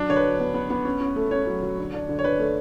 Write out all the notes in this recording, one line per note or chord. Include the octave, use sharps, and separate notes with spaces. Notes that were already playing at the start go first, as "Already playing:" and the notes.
Already playing: F#3 D4
D3 C#5
B4
F#3
B3
B3
B3
C#4
C#4
A3
C#4 C#5
F#3
F#3
D3
D4
D3
C#5
D4 B4
A3